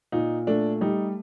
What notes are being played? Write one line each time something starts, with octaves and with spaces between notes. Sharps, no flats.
A#2 D#4
A3 D4
G3 D#4